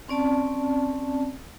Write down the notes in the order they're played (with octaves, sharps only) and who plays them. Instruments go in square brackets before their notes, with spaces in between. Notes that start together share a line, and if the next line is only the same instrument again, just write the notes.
[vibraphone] C4 C#4 D5 A5